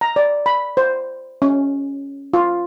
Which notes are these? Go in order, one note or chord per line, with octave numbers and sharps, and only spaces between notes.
A#5
D5
B5
C5
C#4
F4